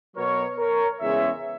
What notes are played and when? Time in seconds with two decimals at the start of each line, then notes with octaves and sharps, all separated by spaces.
0.16 B2 F#3 B3 A#4 C#5
0.58 A#4 C#5
1.00 E2 C#3 G#3 C#4 C#5 E5